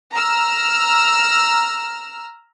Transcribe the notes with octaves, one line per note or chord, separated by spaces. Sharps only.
A#5 E6 F6